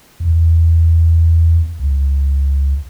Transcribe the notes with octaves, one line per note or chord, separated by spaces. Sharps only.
E2
C#2